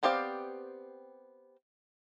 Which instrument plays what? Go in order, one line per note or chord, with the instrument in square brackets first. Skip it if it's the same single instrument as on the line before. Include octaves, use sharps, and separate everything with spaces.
[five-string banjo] B3 C4 G4 D5 F5